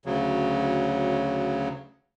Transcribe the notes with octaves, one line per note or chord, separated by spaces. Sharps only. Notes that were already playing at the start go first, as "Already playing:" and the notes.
D2 C#3 F#3